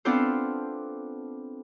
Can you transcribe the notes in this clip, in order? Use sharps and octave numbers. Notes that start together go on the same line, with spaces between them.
B3 C4 D4 F4 A4 C5